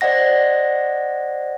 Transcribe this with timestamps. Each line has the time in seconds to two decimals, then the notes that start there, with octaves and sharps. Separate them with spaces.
0.01 C5 D5 D#5 F#5 A#6